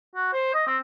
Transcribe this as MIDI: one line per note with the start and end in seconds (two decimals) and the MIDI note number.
0.16 0.33 66
0.33 0.53 72
0.54 0.63 75
0.67 0.78 60